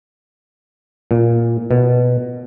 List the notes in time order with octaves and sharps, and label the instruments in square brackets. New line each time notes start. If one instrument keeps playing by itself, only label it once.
[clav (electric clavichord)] A#2
B2